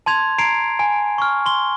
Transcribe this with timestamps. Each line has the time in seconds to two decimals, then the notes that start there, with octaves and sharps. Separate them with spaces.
0.06 A5 C6 G#6 F7
0.38 A#5 G#6 C7 D7 F7
0.79 G#5
1.18 C#6 F6
1.46 C6 G7